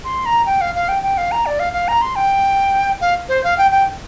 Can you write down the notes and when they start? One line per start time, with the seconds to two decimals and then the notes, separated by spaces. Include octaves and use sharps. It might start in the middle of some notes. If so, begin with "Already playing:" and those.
0.05 C6
0.26 A#5
0.46 G5
0.61 F5
0.75 F5
0.88 G5
1.03 G5
1.17 F5
1.32 A#5
1.46 D5
1.59 F5
1.73 F5
1.88 A#5
2.02 C6
2.16 G5
3.01 F5
3.29 C5
3.44 F5
3.58 G5
3.71 G5